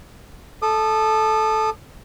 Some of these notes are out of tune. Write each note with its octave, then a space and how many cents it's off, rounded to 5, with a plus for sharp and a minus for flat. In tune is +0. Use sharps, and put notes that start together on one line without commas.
A4 -10 D#6 -35